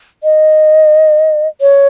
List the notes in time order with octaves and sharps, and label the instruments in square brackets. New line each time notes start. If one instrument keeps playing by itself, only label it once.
[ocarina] D#5
C#5